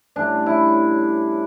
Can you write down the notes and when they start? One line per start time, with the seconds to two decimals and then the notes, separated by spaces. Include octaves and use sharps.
0.16 A2 G3 C#4 D4
0.46 E4